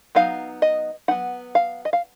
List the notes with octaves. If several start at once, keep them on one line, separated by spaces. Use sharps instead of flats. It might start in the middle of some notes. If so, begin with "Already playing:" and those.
F#3 B3 D#4 F5
D#5
F#3 B3 D#4 F#5
F5
D#5
F5